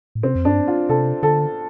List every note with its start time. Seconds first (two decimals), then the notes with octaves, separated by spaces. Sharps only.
0.15 A2
0.23 C3 C4
0.35 F2
0.45 G2 D4
0.68 F4
0.89 C3 A4
1.23 D3 A4